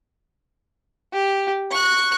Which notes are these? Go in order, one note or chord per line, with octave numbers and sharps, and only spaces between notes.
G4
C#6 F#6